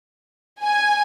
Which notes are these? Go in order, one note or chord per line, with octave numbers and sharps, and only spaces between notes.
G#5